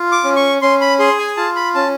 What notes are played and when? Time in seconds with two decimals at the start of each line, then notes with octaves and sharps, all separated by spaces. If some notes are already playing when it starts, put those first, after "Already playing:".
Already playing: F4
0.12 D6
0.24 C#4
0.36 C#6
0.62 C#4 C6
0.81 B5
0.99 G#4 C6
1.19 G#5
1.37 F4 A5
1.56 B5
1.75 C#4 A5